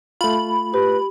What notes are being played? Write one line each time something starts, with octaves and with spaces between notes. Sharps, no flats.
A3 F4 B5
G4 B4